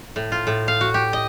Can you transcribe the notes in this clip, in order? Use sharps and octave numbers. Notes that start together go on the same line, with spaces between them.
A2
F4
A2
F5
F#4
G4
D#5